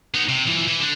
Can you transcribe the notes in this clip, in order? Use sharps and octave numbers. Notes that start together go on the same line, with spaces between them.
B3 D#4
C3
E3 F3
E3
D3 D4